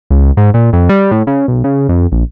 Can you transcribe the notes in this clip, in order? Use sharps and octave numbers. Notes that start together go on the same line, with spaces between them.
C#2
G#2
A#2
F2
G3
A2
C#3
B1
C#3
F2
A#1